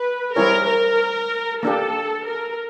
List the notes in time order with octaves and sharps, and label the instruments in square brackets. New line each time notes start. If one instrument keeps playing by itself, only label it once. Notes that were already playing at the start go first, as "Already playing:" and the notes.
Already playing: [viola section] B4
[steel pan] G3 C4 E4 G#4 C#5 [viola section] A#4
[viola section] A#4
[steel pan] A#3 D4 G4 [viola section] A4
[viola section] A#4